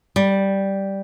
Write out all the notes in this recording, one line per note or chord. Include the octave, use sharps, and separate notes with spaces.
G3